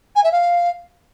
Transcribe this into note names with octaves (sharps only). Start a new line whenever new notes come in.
G#5
E5
F5